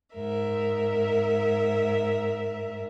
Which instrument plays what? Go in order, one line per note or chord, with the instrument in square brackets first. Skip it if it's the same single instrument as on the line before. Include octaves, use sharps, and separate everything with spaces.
[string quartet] G#2 A#4 E5